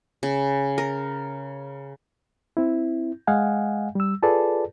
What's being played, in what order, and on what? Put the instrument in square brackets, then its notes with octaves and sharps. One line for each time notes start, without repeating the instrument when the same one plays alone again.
[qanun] C#3
A#4
[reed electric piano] C4 E4
G#3 D#5 F5 F#5 G#5
G3 E6
F4 G#4 A4 B4 D5 A5